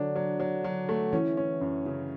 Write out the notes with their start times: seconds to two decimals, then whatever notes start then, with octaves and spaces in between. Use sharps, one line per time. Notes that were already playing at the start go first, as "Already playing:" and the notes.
Already playing: D3 F#3 D4
0.15 F#3
0.40 F#3
0.64 F#3
0.89 A3
1.13 E3 C#4
1.37 C#4
1.61 F#2
1.86 C#3